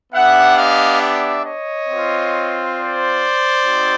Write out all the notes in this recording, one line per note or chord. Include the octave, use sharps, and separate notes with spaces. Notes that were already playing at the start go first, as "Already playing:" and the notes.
B3 D4 G4 E5 F#5
D#5 F5
D5 E5
C#5 D#5
C4 F4
C5 D5
C4 D#4 F#4